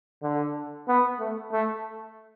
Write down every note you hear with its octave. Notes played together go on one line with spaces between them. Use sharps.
D3
B3
A3
A3